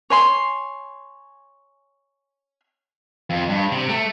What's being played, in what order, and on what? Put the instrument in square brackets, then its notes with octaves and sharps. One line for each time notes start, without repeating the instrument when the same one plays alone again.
[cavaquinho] C#5 G#5 C6
[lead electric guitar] F2
G2
C3
A3